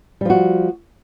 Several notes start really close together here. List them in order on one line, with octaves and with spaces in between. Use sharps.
G3 F3 F#4